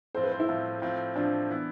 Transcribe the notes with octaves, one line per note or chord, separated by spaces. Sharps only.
A2 F3 C4 F4 C5
B4
C5
E4
A2 F3 C4 F4
A2 F3 C4 F4
A2 F3 C4 D4 F4
E3 B3 E4